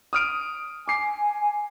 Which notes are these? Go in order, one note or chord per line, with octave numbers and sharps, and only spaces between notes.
D#6 F6 D7
G#5 D6 C7